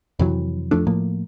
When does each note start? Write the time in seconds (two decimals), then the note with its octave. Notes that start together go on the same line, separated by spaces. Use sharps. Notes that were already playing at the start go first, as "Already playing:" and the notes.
0.19 F2 C3 E3 F#3
0.71 F2 F3 A3 D4
0.87 A2 F3 A#3